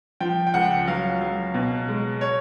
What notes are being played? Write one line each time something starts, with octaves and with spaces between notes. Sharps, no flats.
F3 G5
G5
C#2 F#5
F#3 F5
F#3
B2
G#3
C#5